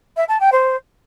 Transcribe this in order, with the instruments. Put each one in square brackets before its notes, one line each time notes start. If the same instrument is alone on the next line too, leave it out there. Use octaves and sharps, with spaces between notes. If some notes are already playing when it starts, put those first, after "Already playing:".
[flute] E5
A5
G5
C5